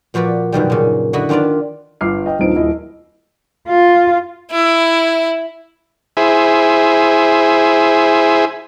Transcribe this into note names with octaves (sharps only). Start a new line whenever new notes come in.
A#2 F3 F#4 B4 D5
F#2 B2 D#3 G3
A#2 C#3
D3 E4 F#4 D#5 B5
D#3 D4 F4 B4 D5
G1 D6 F6 C7
D#5 G5
D#1 G2 F3 C4 D#4 D7
D#1 E4 D#5
F4
E4
E4 G#4 C5 E5 G#5